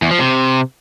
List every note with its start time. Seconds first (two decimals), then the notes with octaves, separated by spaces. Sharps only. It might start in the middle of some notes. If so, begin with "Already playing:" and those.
0.02 E2
0.11 F3
0.20 C3